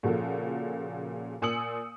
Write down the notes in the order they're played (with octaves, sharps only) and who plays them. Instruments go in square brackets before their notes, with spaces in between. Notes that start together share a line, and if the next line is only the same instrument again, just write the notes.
[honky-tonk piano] A#2 C#3 F3 F#4 A4
A#2 G#5 D#6 E6 C#7 F#7